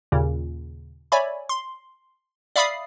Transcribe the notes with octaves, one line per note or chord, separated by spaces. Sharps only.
D#2 A#2 C#3
C#5 D5 E5 G#5 B5
C6
D5 E5 F5 B5 D#6 C7